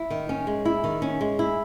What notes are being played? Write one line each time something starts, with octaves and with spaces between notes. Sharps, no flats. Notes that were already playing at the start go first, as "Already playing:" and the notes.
Already playing: E4
D#3
C#4
G#3
E4
D#3
C#4
G#3
E4